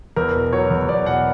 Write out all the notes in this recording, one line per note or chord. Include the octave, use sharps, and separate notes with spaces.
E2 A#4
B2
F#3 C#5
E2
E2 D5
B2 F#5